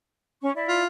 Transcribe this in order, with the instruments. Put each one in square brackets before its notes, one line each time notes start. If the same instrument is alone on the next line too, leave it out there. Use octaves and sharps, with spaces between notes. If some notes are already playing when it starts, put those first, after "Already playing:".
[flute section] C#4 C#6
E4 D5
[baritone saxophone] F4